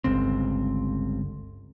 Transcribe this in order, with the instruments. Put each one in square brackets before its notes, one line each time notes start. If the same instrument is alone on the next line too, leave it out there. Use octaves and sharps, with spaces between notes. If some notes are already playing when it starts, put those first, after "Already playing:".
[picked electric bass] G1 C#2 C4